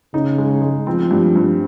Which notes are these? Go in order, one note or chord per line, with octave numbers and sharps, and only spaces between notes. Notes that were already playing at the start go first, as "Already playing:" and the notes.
C#3 D#4
G#3
G#3
F3 C4
G2
G2